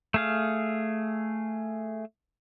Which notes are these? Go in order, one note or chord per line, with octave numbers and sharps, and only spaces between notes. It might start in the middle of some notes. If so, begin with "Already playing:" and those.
A3 G#4 F5